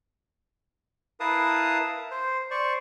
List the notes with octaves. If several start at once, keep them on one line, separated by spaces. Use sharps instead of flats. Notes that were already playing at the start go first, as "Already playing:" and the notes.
E4 A#4 B4 F5 A5 D#6
C5
C5 D5 C#6